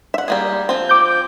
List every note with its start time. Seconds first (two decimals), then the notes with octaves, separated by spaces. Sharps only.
0.14 E5 F#5
0.28 G3 A#3 G#4
0.69 F3 C4
0.89 D6 G6